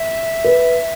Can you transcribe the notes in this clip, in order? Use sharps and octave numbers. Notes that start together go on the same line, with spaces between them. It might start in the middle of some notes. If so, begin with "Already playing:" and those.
Already playing: E5
B4